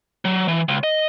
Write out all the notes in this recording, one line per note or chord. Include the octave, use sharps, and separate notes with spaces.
F#3
E3
C#2
D#5